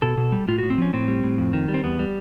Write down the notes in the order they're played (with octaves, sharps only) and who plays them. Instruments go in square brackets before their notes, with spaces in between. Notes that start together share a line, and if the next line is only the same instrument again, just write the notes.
[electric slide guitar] B2 A4
B2
G3
A2 F4
A2 F#4
C4
F3 C#4
A2 C4
G3
A2
F2
D#3
G3
C4
E2 B3
G3